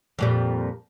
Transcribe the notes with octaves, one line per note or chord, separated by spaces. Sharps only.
F2 A#2 G3